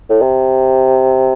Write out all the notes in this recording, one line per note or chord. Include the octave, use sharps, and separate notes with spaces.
A2
C3